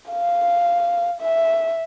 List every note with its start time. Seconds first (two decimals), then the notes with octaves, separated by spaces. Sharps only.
0.10 F5
1.21 E5